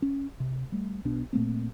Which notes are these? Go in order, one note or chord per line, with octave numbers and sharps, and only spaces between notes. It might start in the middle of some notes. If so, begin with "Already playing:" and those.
C#4
C3
G3 A3
B1 B2 B3 D4
A#2 A3 A#3 C4